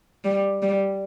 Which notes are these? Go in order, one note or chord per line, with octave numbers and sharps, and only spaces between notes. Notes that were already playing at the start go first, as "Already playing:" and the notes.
G3
G3